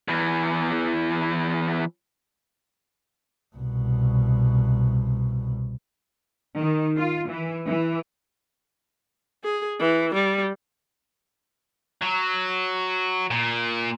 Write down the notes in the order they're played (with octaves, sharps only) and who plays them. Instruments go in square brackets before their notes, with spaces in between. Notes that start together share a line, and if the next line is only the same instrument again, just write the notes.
[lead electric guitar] E2 E3
[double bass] C2 B2
[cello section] D#3
F4
E3
E3
[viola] G#4
E3
G3
[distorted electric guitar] F#3
A#2